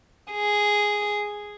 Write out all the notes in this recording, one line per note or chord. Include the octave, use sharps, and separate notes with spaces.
G#4